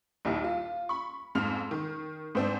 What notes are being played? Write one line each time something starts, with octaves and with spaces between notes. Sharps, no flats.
A#1 D#2 G3 D#4 E4
F4
B5 C#6
F2 G#2 F6 F7
D#3
G#2 C4 D4